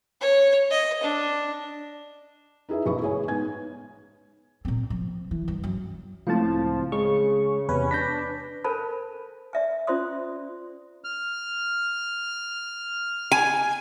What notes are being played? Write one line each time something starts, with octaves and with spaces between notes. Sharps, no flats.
C#5
D#5
D4
D#4 E4 G#4 B4 E5
F#1 B1 E3 B4 B5 C#6
A2 G#4 C#5 G#5
G#2 B3 G#5 G#6
A#2 C4
F3
E3
G2
F#2
C#2 A2 F3 C4 E4 F5 A5
C#3 G#3 G#4 C#6
E2 C3 C#4 B4
D4 G6 A#6 B6
A4 A#4 C5 G#5 A5 B5
D5 E5 G#5
C#4 F4 C5 D5 C6 D#6
F6
G#5